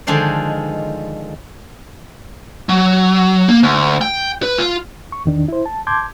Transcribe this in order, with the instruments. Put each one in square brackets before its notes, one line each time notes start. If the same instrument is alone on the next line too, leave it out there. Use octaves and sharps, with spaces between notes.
[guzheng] D3 D#3 F3 G#3 C5 D5
[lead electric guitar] F#3
A#3
D2
G5
B4
F4
[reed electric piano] C#6
E2 D#3 D4
E4 C5
A5
A5 C6 D6 G6 G#6